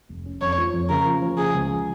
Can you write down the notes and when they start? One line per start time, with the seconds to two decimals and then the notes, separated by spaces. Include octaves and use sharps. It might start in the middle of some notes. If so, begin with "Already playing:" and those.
0.09 F1
0.25 C#4
0.41 F2 C#5
0.58 F3
0.74 F2
0.90 C#3 A#4
1.06 F3
1.22 F3
1.38 C#3 G#4
1.54 C#2
1.70 F3